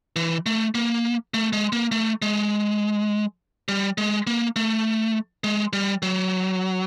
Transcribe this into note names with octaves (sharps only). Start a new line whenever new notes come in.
E3
A3
A#3
A3
G#3
A#3
A3
G#3
G3
G#3
A#3
A3
G#3
G3
F#3